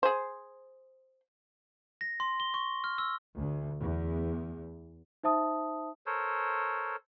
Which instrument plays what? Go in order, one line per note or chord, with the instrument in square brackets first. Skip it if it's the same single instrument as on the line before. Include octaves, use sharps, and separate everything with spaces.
[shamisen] G#4 C5
[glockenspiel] A#6
C6
G7
C#6
F6
E6
[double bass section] D2
E2
[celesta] D#4 C5 E5 A5 D#6
[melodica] A4 A#4 C5 C#5